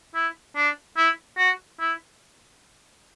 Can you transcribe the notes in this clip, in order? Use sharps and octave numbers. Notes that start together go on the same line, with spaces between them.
E4
D4
E4
F#4
E4